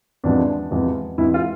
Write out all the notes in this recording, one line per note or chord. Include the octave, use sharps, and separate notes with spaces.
E2 C3 F3 G#3 D4
E2 C3 F3 G#3
E2 C3 E3 G#3 E4
F4